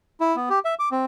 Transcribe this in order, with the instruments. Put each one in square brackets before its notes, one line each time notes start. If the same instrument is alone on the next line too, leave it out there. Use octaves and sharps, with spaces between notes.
[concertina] E4
B3
G4
E5
D6
C4